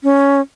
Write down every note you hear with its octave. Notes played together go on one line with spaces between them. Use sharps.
C#4